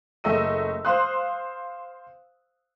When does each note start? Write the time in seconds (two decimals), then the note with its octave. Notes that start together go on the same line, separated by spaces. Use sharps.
0.24 F#1 A3 D#5 E6 D#7
0.85 C5 F5 C6 D#6 F#6